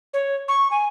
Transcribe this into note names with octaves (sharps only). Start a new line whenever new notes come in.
C#5
C#6
G#5